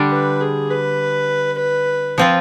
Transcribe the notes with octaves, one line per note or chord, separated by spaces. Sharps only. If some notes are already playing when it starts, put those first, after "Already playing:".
Already playing: D3 G3 D4
B4
G#4
B4
B4
F3 C4 F4